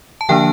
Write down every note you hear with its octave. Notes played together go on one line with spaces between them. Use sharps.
A5
D3 F3 A#3 D4 G5